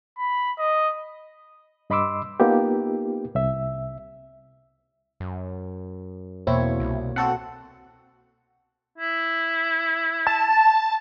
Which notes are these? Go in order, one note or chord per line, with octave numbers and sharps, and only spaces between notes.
B5
D#5
G2 D#5 B5 C6 D6 E6
A#3 B3 D#4 F4 G4
C2 E5
F#2
E2 B2 A#3 C4 E4 C#5
C2
C4 F#4 A4 F#5
E4
A5